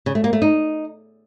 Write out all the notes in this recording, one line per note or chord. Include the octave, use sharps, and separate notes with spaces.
C#3
A3
A#3
A3
D#4